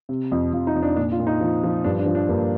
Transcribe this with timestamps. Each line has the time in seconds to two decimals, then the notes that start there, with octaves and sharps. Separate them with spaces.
0.09 C3
0.32 F2
0.53 F2 F4
0.67 D#4
0.75 F2
0.83 D4
0.96 A#2 D4
1.12 F4
1.20 A#2
1.27 D#4
1.41 F3
1.64 F3
1.84 G2 D4
1.99 D4
2.06 F3
2.15 D4
2.29 G2 A#3